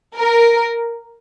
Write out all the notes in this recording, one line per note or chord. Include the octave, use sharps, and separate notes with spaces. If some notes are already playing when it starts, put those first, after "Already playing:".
A#4